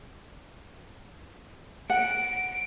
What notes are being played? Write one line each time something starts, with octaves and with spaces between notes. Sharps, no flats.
F#5 D7